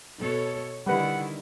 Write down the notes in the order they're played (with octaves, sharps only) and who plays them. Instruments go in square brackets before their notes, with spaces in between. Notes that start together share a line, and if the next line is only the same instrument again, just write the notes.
[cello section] B2 A4 C#5
[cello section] D3 D#3 E4 [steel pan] G3 B4 [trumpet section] F#5